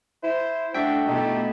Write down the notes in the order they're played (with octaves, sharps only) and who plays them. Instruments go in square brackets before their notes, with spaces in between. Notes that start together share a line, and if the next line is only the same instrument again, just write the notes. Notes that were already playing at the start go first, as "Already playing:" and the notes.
[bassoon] E4 [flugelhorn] C5
[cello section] A3 D4 [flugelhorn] F#4 [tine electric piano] E5 G5
[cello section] B2 A3 E4 [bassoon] D#4 [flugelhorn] G4